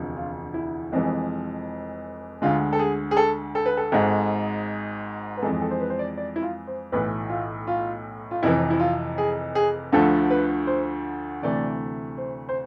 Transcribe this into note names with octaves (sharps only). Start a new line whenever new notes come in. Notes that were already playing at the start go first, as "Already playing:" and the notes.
Already playing: E1 D2 C3 F3
F4
E4
F1 F2 E3 G#3
D2 D3 G#3 F4
A4
G#4
G#4
A4
A4
B4
A4
G#1 G#2 G#3
B4
F2 E3 G#3 A4
A4
C5
B4
C5
D5
D5
E4
F4
C5
B1 A2 E3 A3 B4
F4
F4
F4
F1 F2 C3 E3 E4
E4
F4
G#4
G#4
D2 D3 F3 A3 A4
B4
C5
D2 C3 E3 A3 D5
C5
C5